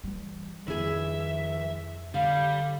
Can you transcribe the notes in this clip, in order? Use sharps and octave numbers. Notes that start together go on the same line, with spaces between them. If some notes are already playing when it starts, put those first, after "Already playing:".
E3 G3
F2 D#3 F3 E4 G#4 E5
D3 G3 F5